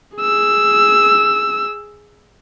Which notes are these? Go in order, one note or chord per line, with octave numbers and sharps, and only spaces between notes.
G#4 E6